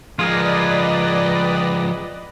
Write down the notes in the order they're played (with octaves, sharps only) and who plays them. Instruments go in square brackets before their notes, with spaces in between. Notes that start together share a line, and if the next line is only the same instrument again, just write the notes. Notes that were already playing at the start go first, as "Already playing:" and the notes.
[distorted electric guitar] F3 G#3 [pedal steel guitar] F4 G#4 A#4 [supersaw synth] B4 D5 D#5